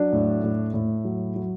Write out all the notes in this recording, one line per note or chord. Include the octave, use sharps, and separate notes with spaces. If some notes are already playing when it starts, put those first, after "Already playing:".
Already playing: F#3 D4
A2
A2
A2
F#3
F#3